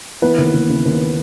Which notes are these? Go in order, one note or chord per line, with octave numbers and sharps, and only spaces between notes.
E3 B3 B4
D#2
D#2
C#3
D#2